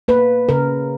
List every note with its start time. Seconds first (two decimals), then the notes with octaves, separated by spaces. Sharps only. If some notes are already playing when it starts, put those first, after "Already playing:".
0.08 A#3 B4
0.49 C#3 A#4